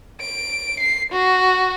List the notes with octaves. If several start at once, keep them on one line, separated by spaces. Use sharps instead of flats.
D7
C7
F#4